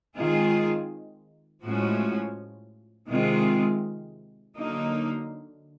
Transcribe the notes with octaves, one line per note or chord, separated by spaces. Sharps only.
D#3 G#3 C4 F4 G#4
A2 F3 G#3 C#4 F#4
C3 D#3 G#3 C4 F4
D3 F#3 A#3 D#4